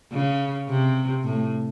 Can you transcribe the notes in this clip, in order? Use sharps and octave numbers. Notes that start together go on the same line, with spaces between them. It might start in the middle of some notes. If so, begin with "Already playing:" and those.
C#3
C3
A2